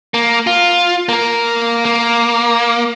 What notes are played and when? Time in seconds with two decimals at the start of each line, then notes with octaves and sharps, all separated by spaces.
0.14 A#3
0.47 F4
1.09 A#3 A#4
1.85 A#3